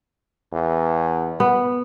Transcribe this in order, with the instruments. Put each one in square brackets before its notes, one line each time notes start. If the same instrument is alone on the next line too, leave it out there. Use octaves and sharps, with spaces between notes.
[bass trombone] E2
[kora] B3